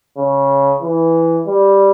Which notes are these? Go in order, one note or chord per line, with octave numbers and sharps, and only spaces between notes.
C#3
E3
G3